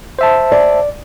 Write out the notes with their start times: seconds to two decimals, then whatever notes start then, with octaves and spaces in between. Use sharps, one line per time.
0.19 C5 E5 A5
0.52 D5